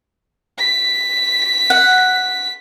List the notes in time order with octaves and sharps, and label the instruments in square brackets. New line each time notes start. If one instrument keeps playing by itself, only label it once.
[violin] B6
[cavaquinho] F#5